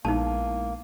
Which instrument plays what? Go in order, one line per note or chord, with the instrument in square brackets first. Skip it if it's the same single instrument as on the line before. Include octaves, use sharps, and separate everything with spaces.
[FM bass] A#1 [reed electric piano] G#3 B3 E4 [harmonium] A#3 [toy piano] D#4 A5